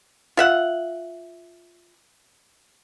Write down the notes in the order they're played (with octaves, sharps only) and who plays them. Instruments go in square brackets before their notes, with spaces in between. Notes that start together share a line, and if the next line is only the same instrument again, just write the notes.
[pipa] F4 E5 F#5